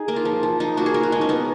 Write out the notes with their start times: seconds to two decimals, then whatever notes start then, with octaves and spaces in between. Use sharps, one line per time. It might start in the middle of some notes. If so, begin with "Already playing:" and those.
Already playing: D#4 G#4
0.08 A#3 A#4
0.16 F4
0.25 F3
0.43 F3
0.60 F3 D#4
0.77 A#3 F#4
0.86 G#4
0.94 F3 A#4
1.03 F#4
1.12 G#3 D#4
1.21 C#4
1.29 B3 D#4